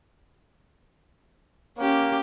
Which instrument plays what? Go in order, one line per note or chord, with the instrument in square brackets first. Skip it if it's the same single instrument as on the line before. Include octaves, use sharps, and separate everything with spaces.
[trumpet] A#3 [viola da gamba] C#4 G4